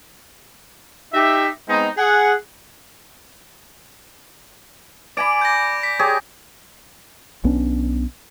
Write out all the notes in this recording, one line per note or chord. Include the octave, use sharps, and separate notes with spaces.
D#4 G4 E5
G#3 B3 C4 D#4
G#4 F#5
D5 G#5 B5 D6 D7
G6 A#6
B6
G4 G#4 C#5
B1 B3 C#4 D4